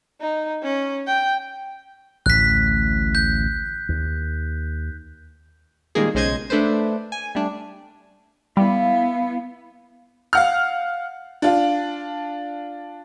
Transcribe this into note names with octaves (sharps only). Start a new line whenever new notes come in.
D#4
C#4
G5
A1 D2 A2 F#6 B6
G6
D#2
A#2 D#3 G3 G#3 A#3 G#4
B1 C#3 G#3 C5 D#5 G#6
A3 D4 A4 B4 C5
G#5
G3 A3 D4
G3 B3 E4 F5
F5 F#5 F6
D4 F4